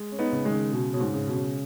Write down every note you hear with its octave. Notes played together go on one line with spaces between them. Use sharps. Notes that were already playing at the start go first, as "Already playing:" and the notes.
Already playing: G#3
C#4
B3 D#4
C#3
D#3 G#3
C#3
B2 G#3
B2 C#4
G#2
C#3
B2
C#3